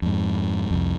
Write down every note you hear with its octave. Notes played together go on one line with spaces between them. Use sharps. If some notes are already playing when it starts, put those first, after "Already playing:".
F2 G#2
C2 F2